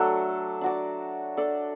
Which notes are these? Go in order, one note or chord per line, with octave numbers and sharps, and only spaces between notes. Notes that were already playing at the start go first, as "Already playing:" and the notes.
Already playing: F#3 A3 D4 A4
D4 F#4 D5
D4 A4 D5